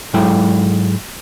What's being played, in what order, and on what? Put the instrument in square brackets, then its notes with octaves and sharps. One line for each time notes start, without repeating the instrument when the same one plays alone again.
[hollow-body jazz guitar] G#2 F#3 G#3 E4 A4 G5